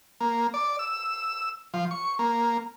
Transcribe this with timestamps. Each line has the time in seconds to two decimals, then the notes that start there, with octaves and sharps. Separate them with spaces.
0.20 A#3
0.54 D5
0.79 E6
1.74 F3
1.91 C#6
2.19 A#3